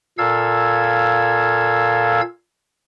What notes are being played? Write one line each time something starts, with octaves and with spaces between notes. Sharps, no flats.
A#2 A4 F5 E6 G#6